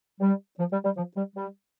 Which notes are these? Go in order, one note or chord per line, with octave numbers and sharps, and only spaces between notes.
G3
F3
G3
G3
F3
G3
G3